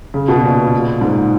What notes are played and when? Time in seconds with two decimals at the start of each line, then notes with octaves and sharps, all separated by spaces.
0.14 C#3
0.28 B2
0.43 A#2
1.01 G#2